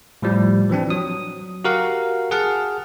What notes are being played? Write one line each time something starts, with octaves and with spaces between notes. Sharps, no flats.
A2 F3 G3
E3 F3 C4 D4
F#3 D#6
F#4 G4 A#4 F5 F#5
G#4 F#5 A5 F6